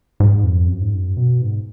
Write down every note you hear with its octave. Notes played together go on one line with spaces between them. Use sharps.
G#2
F2
F#2
G#2
F#2
B2
G#2